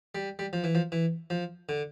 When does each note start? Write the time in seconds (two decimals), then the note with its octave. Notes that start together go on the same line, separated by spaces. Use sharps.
0.15 G3
0.39 G3
0.53 F3
0.64 E3
0.75 F3
0.92 E3
1.30 F3
1.69 D3